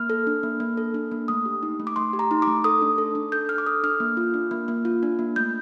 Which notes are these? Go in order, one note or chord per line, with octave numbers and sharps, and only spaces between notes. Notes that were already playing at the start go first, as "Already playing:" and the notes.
Already playing: A#3 F6
A4
D4
A#3
A#3
A4
D4
A#3
A3 D#6
G4
D#4
A3
D6
A3 C6
G4
A#5
D#4
A3 D6
A4 D#6
D4
A4
D4
A4 G6
D4 F6
D6
A4 D#6
D4 F6
A#3
F4
D4
A#3
A#3
F4
D4
A#3
A3 G6